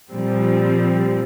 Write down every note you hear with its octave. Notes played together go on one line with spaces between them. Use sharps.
A#2 F3 G3 C4